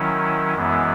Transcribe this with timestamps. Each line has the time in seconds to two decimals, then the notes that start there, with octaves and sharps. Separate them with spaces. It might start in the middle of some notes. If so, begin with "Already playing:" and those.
Already playing: D#3 F#3 C#4 E4
0.55 F#2 E3 G#3 B3 E4